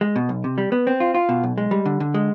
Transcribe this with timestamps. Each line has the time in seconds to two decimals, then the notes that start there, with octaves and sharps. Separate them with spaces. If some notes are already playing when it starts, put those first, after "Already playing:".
0.01 G#3
0.16 B2
0.29 B1
0.44 C3
0.58 G3
0.72 B3
0.87 C4
1.00 F4
1.14 F4
1.29 B2
1.43 B1
1.58 G#3
1.71 G3
1.85 D3
2.00 D3
2.14 G#3